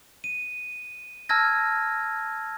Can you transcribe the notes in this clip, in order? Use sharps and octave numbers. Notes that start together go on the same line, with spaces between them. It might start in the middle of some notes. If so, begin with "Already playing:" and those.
D#7
A5 E6 F6 G#6 A#6